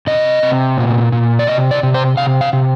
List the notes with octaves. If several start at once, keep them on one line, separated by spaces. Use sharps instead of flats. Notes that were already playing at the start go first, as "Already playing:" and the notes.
C3 D#5
C3
A#2
A#2
D5
C3 D#5
D5
C3
C5
C3 F5
F5
C3